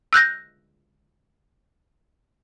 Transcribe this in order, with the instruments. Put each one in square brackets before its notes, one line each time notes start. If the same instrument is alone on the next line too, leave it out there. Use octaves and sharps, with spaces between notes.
[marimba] E6 F#6 G6 A#6